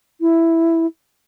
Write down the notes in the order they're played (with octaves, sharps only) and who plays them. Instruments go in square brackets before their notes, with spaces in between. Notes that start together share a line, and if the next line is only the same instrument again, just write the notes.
[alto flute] E4